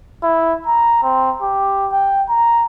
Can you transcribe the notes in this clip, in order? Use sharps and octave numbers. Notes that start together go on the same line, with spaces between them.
E4
A#5
C4
G4
G5
A#5